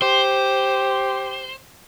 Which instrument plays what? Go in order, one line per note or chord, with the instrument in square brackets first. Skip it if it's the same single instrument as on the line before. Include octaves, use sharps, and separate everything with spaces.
[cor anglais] G4 [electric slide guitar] C5